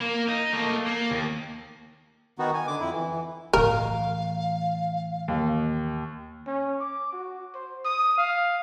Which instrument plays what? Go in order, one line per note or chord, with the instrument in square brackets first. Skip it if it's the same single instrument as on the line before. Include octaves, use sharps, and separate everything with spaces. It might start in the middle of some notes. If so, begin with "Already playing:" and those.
[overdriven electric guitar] A#3
D#4
A3 A#3
A#3
D#2
[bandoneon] D#3 B3 D#4 F#4
G#5
D3 D6
F2 E4
E3
[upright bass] A2 E3 [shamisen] A#4 [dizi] F5
[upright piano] D#2
[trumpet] C#4
D6
F#4
C5
D#6
F5